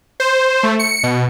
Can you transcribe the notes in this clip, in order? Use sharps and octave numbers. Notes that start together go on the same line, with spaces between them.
C5
A3
C#7
B2